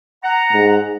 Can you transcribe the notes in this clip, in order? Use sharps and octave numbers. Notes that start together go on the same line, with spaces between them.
F#5 A#5
G#2